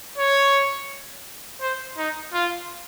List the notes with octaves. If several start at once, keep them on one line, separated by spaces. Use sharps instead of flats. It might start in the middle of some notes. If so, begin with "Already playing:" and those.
C#5
C5
D#4
F4